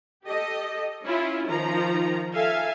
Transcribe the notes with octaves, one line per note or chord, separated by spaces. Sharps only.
G4 A4 D#5
C#4 E4 F4
D#3 F3 A#5
A4 E5 F5 G#5